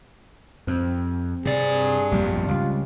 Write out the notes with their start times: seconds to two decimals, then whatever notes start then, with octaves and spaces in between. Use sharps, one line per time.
0.67 F2 C4
1.46 G2 C3 G#4 D5
2.12 A#1 F2 B2 G3
2.48 C#2 F4